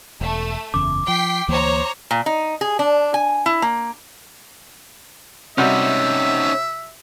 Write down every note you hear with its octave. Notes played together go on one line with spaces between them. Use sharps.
E1 A3
F#1 E2 C#3 D6
F3 G5 B6 C7
D2 E3 A#3 C5 C#5 A#5
A#2
D#4
G#4
D4
G#5
E4
A#3
C3 G3 C#4 D#4 F#4 E5